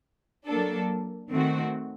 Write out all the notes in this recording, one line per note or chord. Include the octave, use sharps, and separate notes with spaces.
F#3 A#3 D4 A4
D#3 A3 C4 F#4